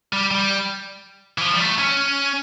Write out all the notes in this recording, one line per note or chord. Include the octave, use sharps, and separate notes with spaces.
G3
G3
E3
F3
G3
A3
C#4